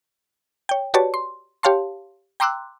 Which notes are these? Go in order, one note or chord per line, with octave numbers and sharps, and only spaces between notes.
C#5 G5
F#4 G4 B4 C#5 D5 A5
C6
G4 C#5 F5 A5 C6
G5 A#5 C6 D6 E6 F#6